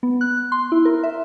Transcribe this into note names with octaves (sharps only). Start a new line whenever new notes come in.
B3
F#6
C6
E4
A#4
E5